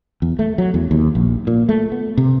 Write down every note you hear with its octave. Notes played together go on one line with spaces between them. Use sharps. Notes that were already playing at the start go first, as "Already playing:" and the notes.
E2
A3
F#3
E2
D#2
A#1
A#2
A3
B3
C3